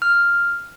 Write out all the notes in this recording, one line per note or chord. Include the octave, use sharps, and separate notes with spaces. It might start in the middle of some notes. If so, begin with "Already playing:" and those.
F6